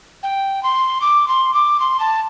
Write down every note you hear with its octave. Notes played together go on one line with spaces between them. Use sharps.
G5
C6
D6
C6
D6
C6
A5